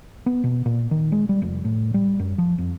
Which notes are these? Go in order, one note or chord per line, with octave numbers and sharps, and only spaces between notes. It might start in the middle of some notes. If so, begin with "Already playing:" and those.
B3
B2
A#2
D#3
G#3
G3
F1
A2
G3
F#2
F3
F2